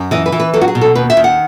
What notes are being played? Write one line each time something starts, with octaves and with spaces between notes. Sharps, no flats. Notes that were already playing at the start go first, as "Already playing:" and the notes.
Already playing: F#2
E3 D#5
B4
E3
B4
F#3 A4
F#4
G#4
B2
A4
D#2 B4
E5
D#3
F#5